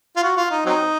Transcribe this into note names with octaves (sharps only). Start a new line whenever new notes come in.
F4
F#4
F4
D#4
F#3 C4 D#4